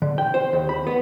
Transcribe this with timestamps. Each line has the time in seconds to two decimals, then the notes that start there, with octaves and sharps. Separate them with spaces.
0.02 D3
0.18 G5
0.34 C5
0.53 D#2
0.69 B5
0.87 B3